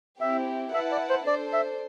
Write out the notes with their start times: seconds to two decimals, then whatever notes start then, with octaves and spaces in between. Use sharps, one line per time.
0.20 C4 E4 G4 E5
0.73 E4 B4 E5 F#5 A5
0.92 D5
1.09 C5
1.26 D4 A4 C5 D5
1.53 E5